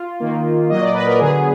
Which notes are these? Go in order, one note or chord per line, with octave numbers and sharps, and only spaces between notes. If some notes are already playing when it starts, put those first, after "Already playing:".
Already playing: F4
D#3 A#3
A#2 F#3 A#3 D#5
D5
B4
A#4
D3 F#3 B3 G#4